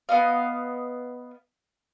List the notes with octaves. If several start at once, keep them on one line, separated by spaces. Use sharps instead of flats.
B3 D#5 F5